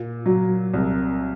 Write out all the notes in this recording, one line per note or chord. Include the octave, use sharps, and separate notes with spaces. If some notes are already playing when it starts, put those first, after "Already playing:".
Already playing: A#2
F#3
C2